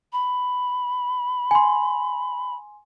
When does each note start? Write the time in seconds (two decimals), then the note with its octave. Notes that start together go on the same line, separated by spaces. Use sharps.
0.13 B5
1.51 G#5 C6